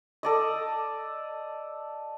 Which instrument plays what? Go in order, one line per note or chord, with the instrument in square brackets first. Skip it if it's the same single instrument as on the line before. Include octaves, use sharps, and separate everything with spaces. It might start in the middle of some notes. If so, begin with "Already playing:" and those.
[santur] A4 D5 D#5